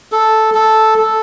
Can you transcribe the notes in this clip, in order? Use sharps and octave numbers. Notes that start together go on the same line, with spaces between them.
A4
A4
A4